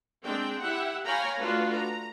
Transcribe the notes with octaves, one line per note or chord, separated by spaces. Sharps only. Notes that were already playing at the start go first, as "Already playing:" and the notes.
G#3 C4 D4 G5
E4 G4 E5 F#5
C#5 F5 G5 G#5 A#5 B5
A3 D4 F4 F#4 B4
A#5